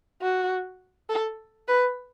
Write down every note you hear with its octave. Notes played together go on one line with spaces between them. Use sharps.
F#4
A4
B4